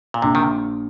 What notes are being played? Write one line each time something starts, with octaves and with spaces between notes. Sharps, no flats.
A#2
A#1 C3
D#3